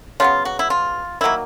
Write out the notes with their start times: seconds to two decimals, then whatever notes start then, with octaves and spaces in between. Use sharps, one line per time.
0.20 C#3 F#3 B3 F4
0.45 F#4
0.59 E4
0.70 F4
1.21 D#3 F#3 A#3 E4